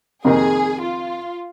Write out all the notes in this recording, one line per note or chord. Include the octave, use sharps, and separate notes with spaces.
F2 C3 D#3 A#3 D#4 G#4
F4